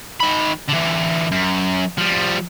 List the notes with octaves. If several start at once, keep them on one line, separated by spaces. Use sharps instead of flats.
D#3 B5
D3 E3
F#2
F3 G3